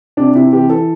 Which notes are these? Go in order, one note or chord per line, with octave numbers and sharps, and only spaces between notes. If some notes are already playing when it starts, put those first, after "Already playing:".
C3 D4
C3 E4
E3 G4
E3 A4